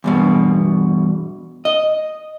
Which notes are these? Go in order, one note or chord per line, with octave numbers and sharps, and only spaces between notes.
E2 G2 B2
D#5